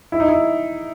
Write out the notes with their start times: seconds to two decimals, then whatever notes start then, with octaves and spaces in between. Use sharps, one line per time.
0.12 E4
0.20 D#4
0.28 E4